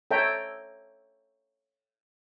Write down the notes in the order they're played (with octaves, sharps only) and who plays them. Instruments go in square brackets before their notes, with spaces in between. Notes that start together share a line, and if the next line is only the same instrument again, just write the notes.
[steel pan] A4 C#5 E5 G5 A#5